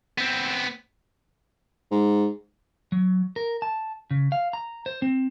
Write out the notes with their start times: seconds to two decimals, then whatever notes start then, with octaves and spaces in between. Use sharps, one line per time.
0.18 B3 C4
1.91 G#2
2.92 F#3
3.36 A#4
3.62 A5
4.11 C#3
4.32 F5
4.53 A#5
4.86 C5
5.02 C4